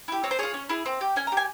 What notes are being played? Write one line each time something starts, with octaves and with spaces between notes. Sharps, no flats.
E4 G4
C4 C#5
C5
F4 G#4 C#5
C#4
E4 G#4
C4
G4
C#4 G#5
A#5
G4
G#5